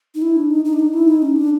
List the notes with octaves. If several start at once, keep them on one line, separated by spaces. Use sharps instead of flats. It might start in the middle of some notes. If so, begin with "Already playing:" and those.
D#4
E4
D4
D#4
D#4
D4
D#4
E4
D#4
C#4
D4